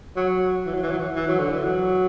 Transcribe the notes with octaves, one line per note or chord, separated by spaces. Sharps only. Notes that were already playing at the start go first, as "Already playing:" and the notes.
F#3
E3
F#3
E3
F#3
E3
E3
F#3
D3
E3
F#3